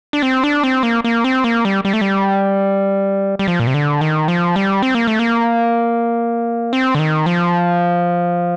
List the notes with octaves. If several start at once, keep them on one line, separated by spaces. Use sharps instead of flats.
D4
C4
D4
C4
A#3
A#3
C4
A#3
G3
G3
A3
G3
G3
F3
A#2
C3
D3
D#3
F3
G3
C4
A#3
A3
A#3
C4
D3
D#3
F3